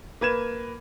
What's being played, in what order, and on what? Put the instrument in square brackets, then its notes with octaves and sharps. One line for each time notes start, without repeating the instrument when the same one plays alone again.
[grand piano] A#3 B4 G#6 E7